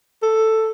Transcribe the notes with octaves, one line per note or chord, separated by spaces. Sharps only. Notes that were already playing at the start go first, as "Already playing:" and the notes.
A4